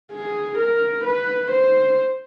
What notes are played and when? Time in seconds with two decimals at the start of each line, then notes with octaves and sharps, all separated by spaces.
0.12 G#4
0.59 A#4
1.05 B4
1.51 C5